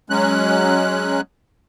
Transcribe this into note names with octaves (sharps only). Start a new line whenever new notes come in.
F#3 G#3 C#4 F#6